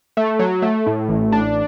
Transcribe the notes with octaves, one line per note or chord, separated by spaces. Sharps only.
A3
F#3
A3
A2
A1
D4